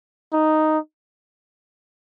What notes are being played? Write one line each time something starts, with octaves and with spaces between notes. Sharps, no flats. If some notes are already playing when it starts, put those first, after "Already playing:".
D#4